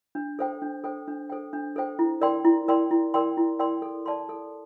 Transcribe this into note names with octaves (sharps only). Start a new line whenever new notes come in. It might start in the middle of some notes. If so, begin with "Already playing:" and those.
D4
A4 C5 G5
D4
A4 C5 G5
D4
A4 C5 G5
D4
A4 C5 G5
E4
A#4 D5 G5 C6
E4
A#4 D5 G5 C6
E4
A#4 D5 G5 C6
E4
A#4 D5 G5 C6
A4
D5 A5 C6
A4